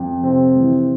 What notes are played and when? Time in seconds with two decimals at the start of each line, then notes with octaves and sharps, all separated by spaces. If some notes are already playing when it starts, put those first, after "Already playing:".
Already playing: F2
0.23 C3 C4
0.56 E3